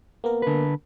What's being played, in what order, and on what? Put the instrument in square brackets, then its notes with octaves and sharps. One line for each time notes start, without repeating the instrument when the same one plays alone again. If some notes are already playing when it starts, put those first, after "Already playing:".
[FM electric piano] A#3 B3 A#4
[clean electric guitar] D3 B4